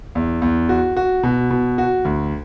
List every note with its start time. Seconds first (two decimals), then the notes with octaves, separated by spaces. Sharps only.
0.15 E2
0.42 E2
0.69 F#4
0.97 F#4
1.23 B2
1.51 B2
1.78 F#4
2.05 D2